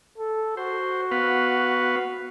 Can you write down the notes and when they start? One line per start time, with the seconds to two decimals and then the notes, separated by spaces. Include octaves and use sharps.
0.18 A4
0.57 F#4 C5
1.11 B3 B4 F5